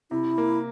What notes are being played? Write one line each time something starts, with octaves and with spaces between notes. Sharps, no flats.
C3 E4
A#3